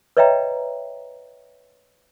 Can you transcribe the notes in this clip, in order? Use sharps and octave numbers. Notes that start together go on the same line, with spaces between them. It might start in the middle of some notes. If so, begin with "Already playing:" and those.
B4 C#5 D#5 E5 G5 A#5